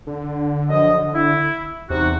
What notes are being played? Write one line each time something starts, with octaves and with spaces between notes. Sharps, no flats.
D3
F#2 F3 D#5
E4
E2 C3 D#4 F#4